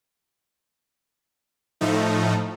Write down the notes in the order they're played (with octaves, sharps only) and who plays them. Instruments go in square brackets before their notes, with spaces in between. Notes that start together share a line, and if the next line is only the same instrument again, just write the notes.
[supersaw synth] A2 F3 A3 D#4